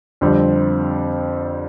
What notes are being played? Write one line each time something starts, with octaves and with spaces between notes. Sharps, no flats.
F2 D3 G3 C4